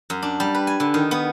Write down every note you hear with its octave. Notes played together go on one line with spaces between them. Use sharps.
F#2
D4
G3
B4
G#5
D3
D#3
B3